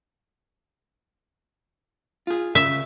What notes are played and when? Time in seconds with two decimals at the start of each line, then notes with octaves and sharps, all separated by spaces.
2.27 F4 G#4
2.55 C#3 E5